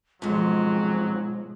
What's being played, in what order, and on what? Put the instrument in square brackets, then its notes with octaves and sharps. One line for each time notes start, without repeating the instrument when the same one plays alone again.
[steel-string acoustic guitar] F2 G#2 [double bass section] B2 F3 [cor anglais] F#3 [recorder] G#3